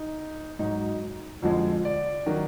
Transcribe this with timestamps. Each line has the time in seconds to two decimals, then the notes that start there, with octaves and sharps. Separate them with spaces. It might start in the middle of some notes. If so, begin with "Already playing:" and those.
Already playing: D#4
0.59 G#2 F#3 D#4
1.42 F2 D3 F3 G#3
1.85 D5
2.26 D#3 F#3